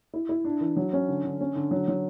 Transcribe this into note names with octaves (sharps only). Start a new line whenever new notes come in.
E4
E4
D4
E3
F#3
C#4
D3
D3
C#4
D3
F#3
F#3